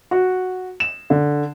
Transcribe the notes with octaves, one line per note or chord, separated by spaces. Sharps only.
F#4
E7
D3